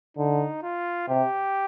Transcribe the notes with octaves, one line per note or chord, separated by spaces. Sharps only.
D3 D#4
F4
C3 G4